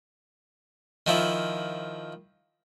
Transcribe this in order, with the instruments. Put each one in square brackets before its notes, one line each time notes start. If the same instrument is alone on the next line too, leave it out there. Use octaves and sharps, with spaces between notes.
[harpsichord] D#3 F3 E4